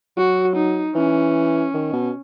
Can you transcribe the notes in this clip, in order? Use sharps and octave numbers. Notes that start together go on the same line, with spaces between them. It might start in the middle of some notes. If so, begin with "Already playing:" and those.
F#3 F#4
D#4
E3 C#4
D#3
B2